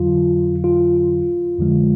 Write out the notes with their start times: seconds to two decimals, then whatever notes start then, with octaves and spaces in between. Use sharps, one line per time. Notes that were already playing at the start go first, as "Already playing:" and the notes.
Already playing: F2 D3 F#3 F4
0.64 F4
1.59 F2 D3 F3 G#3